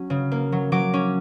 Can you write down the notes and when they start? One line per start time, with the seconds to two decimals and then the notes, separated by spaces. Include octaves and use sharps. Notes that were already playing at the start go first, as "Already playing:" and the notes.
Already playing: F#3 C#4
0.10 C#3
0.32 A#3
0.52 F#3
0.72 F#3 D6
0.94 C#4